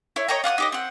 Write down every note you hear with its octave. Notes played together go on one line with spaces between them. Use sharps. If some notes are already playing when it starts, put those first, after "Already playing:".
E4 C#5
C#5 D#5 G5 A#5
F4 F#5 C#6 D#6
D#4 G4 D#5
C4 F#5